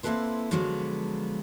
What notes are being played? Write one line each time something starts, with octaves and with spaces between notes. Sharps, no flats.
A#3 C4 E4 A4 B4 C5
D3 F3 F#3 G#3 B3